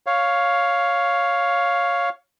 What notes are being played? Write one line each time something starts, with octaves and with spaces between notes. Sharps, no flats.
C#5 F5